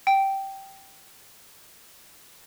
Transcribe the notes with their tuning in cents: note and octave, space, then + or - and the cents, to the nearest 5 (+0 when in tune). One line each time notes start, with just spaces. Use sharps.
G5 -10